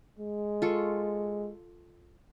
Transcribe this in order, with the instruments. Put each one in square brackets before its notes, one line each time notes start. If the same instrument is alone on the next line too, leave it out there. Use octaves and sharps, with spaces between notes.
[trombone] G#3
[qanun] F4 A4 C#6